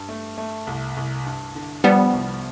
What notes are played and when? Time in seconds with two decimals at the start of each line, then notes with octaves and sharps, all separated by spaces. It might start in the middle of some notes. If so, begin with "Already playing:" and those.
Already playing: G2
0.09 A3
0.38 A3
0.67 C2
0.97 C2
1.26 G2
1.55 D3
1.84 F3 G3 B3
2.13 C2